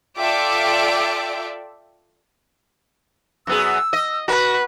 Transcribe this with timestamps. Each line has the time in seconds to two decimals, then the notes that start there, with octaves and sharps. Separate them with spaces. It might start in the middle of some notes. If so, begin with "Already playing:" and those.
0.18 F4 A4 D5 E5 G5 D6
3.47 F#2 B3 G#4 E6
3.93 D#5
4.28 F#4 B4